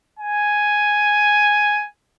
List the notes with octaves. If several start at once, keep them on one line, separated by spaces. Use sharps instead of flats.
G#5